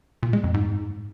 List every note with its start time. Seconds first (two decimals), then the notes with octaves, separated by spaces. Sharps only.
0.23 A#2
0.33 G#3
0.44 F2
0.54 G#2